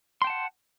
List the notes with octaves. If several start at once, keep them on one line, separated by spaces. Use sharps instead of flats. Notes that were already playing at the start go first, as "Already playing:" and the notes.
F#5 G5 A5 C6